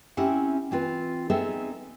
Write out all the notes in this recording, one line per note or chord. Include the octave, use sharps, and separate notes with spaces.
C4 C#4 E4 G4 E5 F#5
E3 C4 F4 B4
B3 C4 D#4 G#4 A4 E5